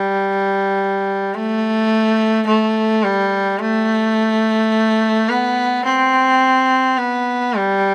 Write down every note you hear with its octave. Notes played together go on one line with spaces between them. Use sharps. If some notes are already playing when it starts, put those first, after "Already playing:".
Already playing: G3
A3
A3
G3
A3
B3
C4
B3
G3